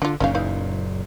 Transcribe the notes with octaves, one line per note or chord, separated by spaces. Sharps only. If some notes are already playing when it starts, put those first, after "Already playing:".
D3 D4 F4
F#1 F#2 A#2 C#4 D#4 F5
E3 D#4 F5